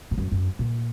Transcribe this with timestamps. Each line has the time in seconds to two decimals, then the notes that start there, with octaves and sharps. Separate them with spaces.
0.11 G#2
0.18 F#2
0.32 F#2
0.59 A#2